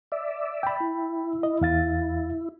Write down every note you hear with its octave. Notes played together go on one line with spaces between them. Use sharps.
D5 E5
G5 B5
E4
D#5
E2 F5 A6